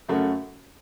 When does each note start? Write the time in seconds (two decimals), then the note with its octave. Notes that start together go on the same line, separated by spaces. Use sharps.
0.09 F#2 C#3 A3 C#4 F#4